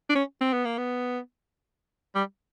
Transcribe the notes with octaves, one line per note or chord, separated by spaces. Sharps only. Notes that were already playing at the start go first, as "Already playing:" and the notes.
D4
C#4
C4
B3
A#3
B3
G3